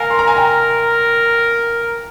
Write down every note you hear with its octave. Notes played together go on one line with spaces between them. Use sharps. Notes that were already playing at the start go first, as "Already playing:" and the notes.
Already playing: A#4 F5 G#5
C6
A#5
G#5
G5 A#5